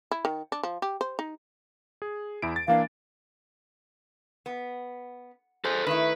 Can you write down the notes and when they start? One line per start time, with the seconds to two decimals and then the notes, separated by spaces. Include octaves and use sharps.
0.11 E4
0.25 D#3
0.52 D4
0.63 F3
0.82 G4
1.01 C5
1.19 D#4
2.02 G#4
2.42 E2 E4 D7
2.56 A6
2.68 E3 A#3 D4 F5
4.46 B3
5.65 G#4 A4 C5
5.87 D#3 A3 E4 B4